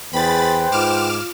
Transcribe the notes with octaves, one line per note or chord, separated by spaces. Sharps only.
E2 G#4 B4 C5 G5 B5 A6
G#2 F4 D6 F6 E7